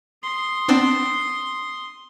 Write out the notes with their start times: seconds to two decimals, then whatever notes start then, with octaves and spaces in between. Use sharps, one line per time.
0.23 C6 D#6
0.68 B3 C4 D4